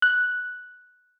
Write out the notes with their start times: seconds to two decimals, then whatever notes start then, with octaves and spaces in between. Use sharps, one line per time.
0.02 F#6